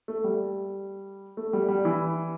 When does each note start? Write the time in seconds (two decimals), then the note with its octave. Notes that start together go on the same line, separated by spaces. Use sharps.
0.08 A3
0.24 G3
1.37 A3
1.53 G3
1.68 G3
1.85 E3